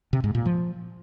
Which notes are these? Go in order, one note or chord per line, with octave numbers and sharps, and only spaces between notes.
C3
G#2
A#2
F3